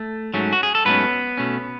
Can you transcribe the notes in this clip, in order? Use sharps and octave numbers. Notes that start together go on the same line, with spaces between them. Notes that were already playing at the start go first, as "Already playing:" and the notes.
Already playing: A3
G#2 F#3 A3 C#4
F#4
G#4
A4
G#2 F#3 A3 B3 C#4 B4
B2 A3 C#4